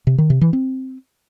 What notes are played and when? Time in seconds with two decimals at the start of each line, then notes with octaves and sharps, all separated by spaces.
0.07 C3
0.18 D#3
0.30 C3
0.41 E3
0.53 C4